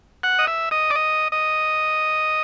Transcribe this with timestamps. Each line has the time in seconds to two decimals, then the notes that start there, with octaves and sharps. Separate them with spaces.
0.23 F#5
0.39 D#5
0.47 E5
0.71 D#5
0.90 D5
0.95 D#5
1.32 D#5